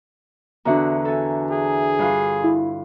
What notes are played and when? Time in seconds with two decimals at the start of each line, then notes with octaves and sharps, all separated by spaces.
0.65 E2 D3 D4 F#4 E5 A#5
1.05 A4 G#5
1.51 G#4
1.99 G2 F4
2.44 E4